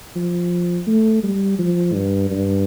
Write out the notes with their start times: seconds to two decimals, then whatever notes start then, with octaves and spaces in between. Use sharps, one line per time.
0.16 F3
0.87 A3
1.23 G3
1.59 F3
1.94 G2
2.30 G2